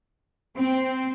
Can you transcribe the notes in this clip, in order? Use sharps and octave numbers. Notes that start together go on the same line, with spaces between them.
C4